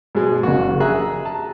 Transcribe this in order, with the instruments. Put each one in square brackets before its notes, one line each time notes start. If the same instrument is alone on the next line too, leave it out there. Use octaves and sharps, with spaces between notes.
[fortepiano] G#2 B2 G#3
[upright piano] F#1 A#3 [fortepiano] F#4
[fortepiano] G#4 E5 F#6 [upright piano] A#5
[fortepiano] A5